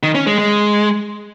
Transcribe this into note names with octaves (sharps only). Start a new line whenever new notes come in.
D#3
C#4
G#3
G#3